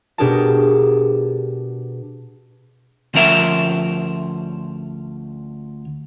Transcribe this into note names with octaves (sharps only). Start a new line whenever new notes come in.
B2 D4 G4 G#4 A#4 A5
D2 F3 C#4 A#4 E5